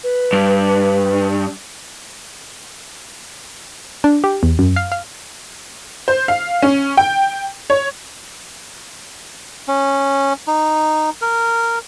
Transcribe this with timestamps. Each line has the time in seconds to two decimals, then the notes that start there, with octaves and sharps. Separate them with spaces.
0.03 B4
0.33 G2
4.04 D4
4.24 G4
4.43 E2
4.59 F#2
4.76 F5
4.92 F5
6.08 C5
6.28 F5
6.62 C#4
6.97 G5
7.70 C#5
9.68 C#4
10.47 D#4
11.21 A#4